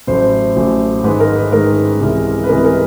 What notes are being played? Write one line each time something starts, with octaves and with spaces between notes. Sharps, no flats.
A1 A2 F#3 A3 C5
A1 A2 F#3 A3
G#2 D#3 G#3 B4
A#4
B4
G#2 D#3 G#3 A#4
C2 C3 E3 G#3
B4
C2 C3 E3 G#3 A#4
A#4